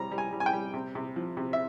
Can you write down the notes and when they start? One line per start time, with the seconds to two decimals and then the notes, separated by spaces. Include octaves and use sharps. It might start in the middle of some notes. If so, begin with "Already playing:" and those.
Already playing: C3 G3 A#5
0.12 G3
0.18 G#5
0.33 G3
0.40 G#5
0.46 G5
0.53 G3
0.74 C3
0.95 C3
1.16 F3
1.37 C3
1.53 E5